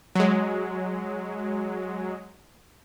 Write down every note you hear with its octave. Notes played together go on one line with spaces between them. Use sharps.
F#3 G#3